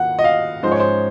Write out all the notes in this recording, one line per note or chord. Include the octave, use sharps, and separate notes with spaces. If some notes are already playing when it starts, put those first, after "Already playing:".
Already playing: D#2 A#3 F#5
D#5
F5
G#2 F3 G#3 C#4 C5
C#5
C5